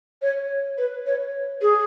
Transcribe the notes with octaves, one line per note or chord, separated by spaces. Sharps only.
C#5
B4
C#5
G#4